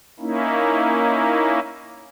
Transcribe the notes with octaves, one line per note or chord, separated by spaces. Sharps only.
A#3 C#4 D#4 E4